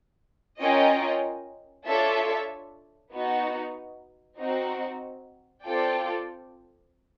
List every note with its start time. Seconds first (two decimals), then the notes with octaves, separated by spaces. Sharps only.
0.61 C#4 F4 A#4 D#5 G5
1.86 D4 F4 A4 C#5 E5
3.13 B3 D#4 F#4
4.38 C4 D#4 F#4
5.63 C4 F4 A4 D5 G5